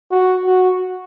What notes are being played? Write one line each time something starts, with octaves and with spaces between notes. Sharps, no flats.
F#4
F#4